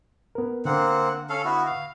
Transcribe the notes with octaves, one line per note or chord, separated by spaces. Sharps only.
B3 A#4
D3 A#3 C4 F#5
C#4 A4 F5
B3 E4 F#4
F5